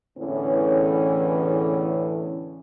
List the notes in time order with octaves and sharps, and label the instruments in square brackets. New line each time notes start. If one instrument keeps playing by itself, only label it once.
[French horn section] E2 A2 D3 E3 C#4